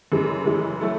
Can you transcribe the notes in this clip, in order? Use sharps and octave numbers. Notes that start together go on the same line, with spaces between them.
F#2 C#3 E3 G#3
F#2 C#3 E3 G#3
F#3 A3 E4 A4